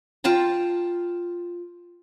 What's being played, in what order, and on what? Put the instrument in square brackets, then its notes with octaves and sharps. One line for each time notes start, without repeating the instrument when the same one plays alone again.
[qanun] F4 G5 A5 A#5